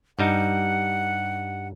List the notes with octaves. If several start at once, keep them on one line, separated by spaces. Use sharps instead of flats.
G2 G3 D#4 F#5